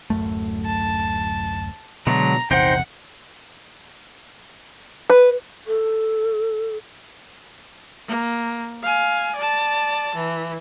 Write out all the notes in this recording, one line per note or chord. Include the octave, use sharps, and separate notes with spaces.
D1 F#2 A3
A5
B2 D3 F#3 G#3 A#5
A#1 E2 C3 D#4 C5 F#5 G5
B4
A4
A#3
F5 G#5
D5 A5
E3